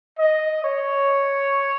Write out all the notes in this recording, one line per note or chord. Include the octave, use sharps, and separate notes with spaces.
D#5
C#5